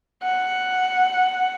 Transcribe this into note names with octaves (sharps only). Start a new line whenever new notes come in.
F#5